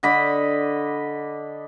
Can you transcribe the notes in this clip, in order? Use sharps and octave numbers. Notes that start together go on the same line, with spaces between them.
D3 D#5 B5 D6